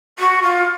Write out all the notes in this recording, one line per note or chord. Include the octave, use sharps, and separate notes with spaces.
F#4
F4